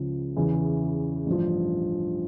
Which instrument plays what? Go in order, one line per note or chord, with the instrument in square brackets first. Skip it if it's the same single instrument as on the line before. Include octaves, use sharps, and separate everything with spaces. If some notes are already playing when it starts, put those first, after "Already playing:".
Already playing: [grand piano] C#2 C#3 F3
E2 C#3 E3
A1 G2 F3